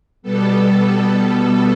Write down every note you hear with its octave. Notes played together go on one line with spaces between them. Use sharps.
B2 G3 B3 A4